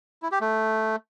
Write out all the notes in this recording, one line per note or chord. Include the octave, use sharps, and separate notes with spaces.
E4
G4
A3